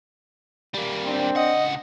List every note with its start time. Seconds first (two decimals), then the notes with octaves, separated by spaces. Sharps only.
0.74 G3 A#3
1.05 C4 D4
1.36 C#2 D#5 F#5